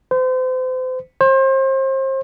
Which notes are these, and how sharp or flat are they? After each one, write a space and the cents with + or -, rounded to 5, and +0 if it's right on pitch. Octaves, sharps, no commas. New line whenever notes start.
C5 -35
C5 +35